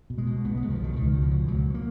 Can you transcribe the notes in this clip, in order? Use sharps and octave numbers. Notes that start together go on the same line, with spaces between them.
B2
G#3
B2
B1 B3
B1 G#3
F3
B2 D#3
C#2 D#3
B2
F3
B2
C#2 F#3
A#3